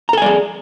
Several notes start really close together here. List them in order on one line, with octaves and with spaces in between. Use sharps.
A#5 A4 G#5 D5 G#4